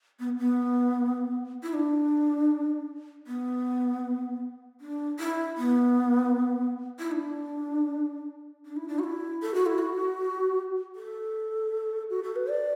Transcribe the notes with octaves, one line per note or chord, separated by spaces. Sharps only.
B3
B3
E4
D4
B3
D4
E4
B3
E4
D4
D4
E4
D4
F#4
E4
A4
F#4
E4
F#4
A4
F#4
A4
B4
D5